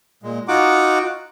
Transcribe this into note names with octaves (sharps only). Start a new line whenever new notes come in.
A#2 G#3
D#4 F4 F#4 F#5 D6